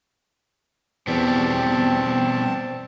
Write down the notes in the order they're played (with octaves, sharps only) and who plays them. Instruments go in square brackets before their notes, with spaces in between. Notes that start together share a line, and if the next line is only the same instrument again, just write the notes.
[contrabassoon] E2 [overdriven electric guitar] B2 G3 [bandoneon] C4 A5